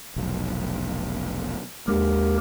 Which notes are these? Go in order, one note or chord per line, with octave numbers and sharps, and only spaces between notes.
F1 B1
D#2 G#3 D4 G4 A#4